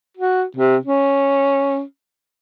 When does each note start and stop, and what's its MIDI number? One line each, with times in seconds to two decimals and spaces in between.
0.17 0.44 66
0.57 0.77 48
0.85 1.82 61